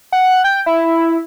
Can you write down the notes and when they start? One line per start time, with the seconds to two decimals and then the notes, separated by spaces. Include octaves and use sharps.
0.12 F#5
0.44 G5
0.66 E4